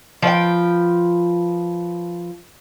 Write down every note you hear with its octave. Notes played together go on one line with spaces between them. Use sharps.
F3 B4 D5 G5